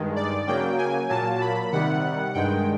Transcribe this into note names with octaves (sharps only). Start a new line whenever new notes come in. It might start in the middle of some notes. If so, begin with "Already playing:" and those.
Already playing: G2 D#3 G#3
D5
C#3 F#3 A#3 G5
G#5
A#2 F#3 A#3 A5
B5
C3 D#3 G3 F#5
G2 D#3 G#3 G5